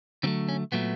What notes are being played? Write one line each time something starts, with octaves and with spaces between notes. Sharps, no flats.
D3 F#3 A3 C4
C#4
A#2 F#3 A3 B3